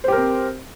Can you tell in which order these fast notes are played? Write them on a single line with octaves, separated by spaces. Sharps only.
C5 G4 A#4 C4